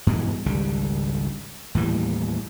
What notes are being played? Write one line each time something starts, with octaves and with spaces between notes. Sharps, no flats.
G2 B2 E3 G#3
G#1 C#2 D3 G3
D#2 A2 E3 G3